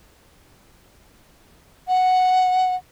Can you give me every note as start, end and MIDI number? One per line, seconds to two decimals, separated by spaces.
1.88 2.76 78